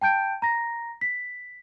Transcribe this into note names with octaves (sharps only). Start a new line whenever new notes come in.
G5 A5 G6 D7
A#5 A#6
B6